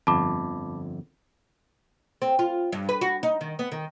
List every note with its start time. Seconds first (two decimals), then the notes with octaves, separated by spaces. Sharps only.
0.07 G1 F2 A5 B5 D6
2.22 C4
2.39 F4
2.72 G2
2.89 B4
3.01 F#4
3.23 D#4
3.41 D#3
3.59 B3
3.72 D#3